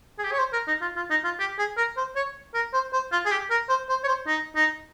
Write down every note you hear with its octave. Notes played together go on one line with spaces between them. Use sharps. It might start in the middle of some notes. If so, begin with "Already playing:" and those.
G#4
G4
C#5
C5
A#4
D#4
F4
F4
D#4
F4
G4
G#4
A#4
C5
C#5
A#4
C5
C5
F4
G#4
G4
A#4
C5
C5
C#5
C5
D#4
D#4